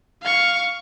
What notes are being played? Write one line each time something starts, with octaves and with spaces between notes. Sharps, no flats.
F5 C#6